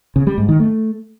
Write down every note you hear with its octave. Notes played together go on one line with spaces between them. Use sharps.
C#3
G3
G#2
D#3
A3